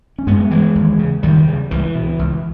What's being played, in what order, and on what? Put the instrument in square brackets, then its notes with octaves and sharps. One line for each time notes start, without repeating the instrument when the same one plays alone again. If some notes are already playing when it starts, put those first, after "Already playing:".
[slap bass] C#4
G2 G#3 B3
E3 G#3
D#2
C#3
D#2 D#3 G3
C#3
C#2 E3
B2
C#2